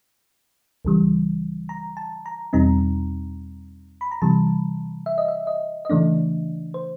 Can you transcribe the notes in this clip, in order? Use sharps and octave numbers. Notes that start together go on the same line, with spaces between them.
C#2 C#3 E3 G3
A#5
A5
A#5
E2 B2 G3 C4 D#4 A#5
B5
A#5
C3 E3 G3 A5
E5
D#5
E5
D#5
D#5
C#3 E3 A3 D4 D5
C5